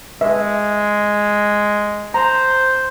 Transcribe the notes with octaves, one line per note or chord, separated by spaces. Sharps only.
G#3 B4 E5
C5 A#5